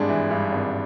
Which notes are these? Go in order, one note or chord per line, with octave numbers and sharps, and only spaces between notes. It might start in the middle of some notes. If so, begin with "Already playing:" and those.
Already playing: G#1 G2 G#3 D4
E3
G2
G#1